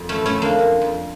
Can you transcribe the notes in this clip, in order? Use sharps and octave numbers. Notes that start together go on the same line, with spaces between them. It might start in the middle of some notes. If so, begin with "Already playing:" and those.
Already playing: F2
A3 C#4
E3
A3 C#4
F2 A#3 D4
F2
F2